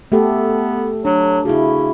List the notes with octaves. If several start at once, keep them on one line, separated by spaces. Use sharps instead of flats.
A3 B3 G4 A4
F#3 D4
C#3 E4 F#4